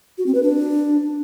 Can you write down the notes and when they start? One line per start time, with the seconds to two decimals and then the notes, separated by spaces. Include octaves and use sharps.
0.18 F#4
0.26 C4
0.35 B4
0.43 D4